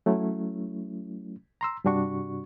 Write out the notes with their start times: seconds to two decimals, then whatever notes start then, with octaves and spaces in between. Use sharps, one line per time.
0.06 F#3 A3 C#4 E4
1.61 A#5 C6 E6
1.84 G2 C3 G3 D4 F#4 C#6